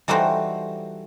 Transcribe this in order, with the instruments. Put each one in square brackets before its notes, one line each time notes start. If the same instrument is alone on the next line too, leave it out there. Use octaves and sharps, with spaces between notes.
[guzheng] E3 G3 A3 D#4 F#4 C5